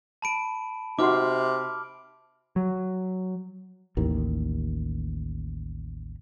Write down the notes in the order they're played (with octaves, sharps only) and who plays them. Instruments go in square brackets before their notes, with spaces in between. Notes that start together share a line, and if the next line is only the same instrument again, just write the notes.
[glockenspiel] A5 B5 D7
[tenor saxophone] C3 [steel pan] D#4 F#4 C6 [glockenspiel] D6 F6
[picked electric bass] F#3
[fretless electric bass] A1 D#2 D#3